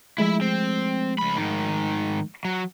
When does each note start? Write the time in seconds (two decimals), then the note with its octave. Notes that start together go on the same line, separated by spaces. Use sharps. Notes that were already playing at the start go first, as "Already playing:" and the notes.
0.18 F3 G#3 A3 E4 E5
0.41 C4
1.18 C#2 B5
1.37 G#2 D#3
2.45 F#3